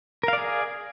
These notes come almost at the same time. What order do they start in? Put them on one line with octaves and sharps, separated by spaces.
A#4 F5 D5 G#4